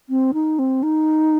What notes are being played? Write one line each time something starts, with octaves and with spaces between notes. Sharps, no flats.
C4
D#4
C4
D#4